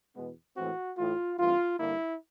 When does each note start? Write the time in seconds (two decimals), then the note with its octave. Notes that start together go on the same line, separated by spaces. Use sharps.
0.16 E2 B2 G#3 B3
0.57 A2 E3 G#3 C4 F#4
0.98 A2 E3 A3 F4
1.39 G2 E3 A3 C4 F4
1.79 G2 D3 G3 A#3 E4